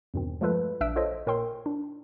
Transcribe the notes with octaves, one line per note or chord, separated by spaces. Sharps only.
E2 G2 B2 D#3 C4
F3 G#3 A3 F4 A4 B4
A#1 D4 E5 E6 F#6 D7
F4 A4 C5 C#5 D#5
A#2 A#4 C#5 G5 C6 E6
D4